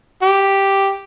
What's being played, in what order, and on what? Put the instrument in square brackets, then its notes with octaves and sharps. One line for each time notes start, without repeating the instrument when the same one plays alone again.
[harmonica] G4